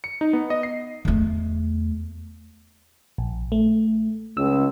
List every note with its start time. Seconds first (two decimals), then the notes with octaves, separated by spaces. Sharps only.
0.04 C#7
0.21 D#4
0.33 B3
0.50 D#5
0.63 C7
1.05 E2 A3
3.18 A#1
3.52 A3
4.37 C#2 E6